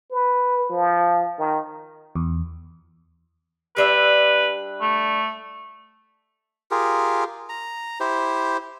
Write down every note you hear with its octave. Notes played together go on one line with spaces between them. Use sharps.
B4
F3
D#3
E2
G3 D4 B4 E5
A3
F4 G4 G#4 A#4
A#5
E4 G4 C5